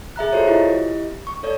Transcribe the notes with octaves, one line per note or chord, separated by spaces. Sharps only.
G#4 E5 A#5 F#6
F4 F#4 A4 C5 C#5 D#5
E4 G4 D#5
C#6
A4 C#5 D5